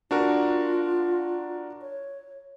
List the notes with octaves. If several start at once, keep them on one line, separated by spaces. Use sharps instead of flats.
D4 F4 F#4 A#4
C#5